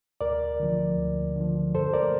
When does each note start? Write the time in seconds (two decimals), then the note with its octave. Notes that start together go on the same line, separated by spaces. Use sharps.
0.21 D2 A#4 D5
0.60 D3 F3
0.98 D2
1.36 D3 F3
1.74 G2 A4 C5
1.93 A#4 D5